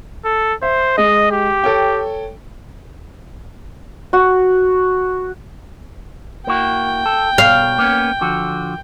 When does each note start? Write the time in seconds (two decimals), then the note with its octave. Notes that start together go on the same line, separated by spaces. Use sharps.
0.25 A4
0.63 C5 E5
0.98 G#3 D#5
1.31 G4
1.64 A4 C#5 G5
4.13 F#4
6.47 A#3 E4 F#4 G5
7.06 A4
7.38 B2 F5
7.79 A#3 B3 C#4
8.21 D3 F3 F#4